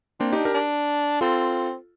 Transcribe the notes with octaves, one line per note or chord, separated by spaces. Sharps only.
A#3 C4 D4
D4 D#4 G4
G4 A#4
D4
C4 F4 A4